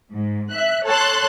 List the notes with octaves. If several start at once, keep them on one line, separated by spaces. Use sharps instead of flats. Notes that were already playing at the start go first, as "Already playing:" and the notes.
G#2
E5 F#6
A4 C#5 A5 C6 F#6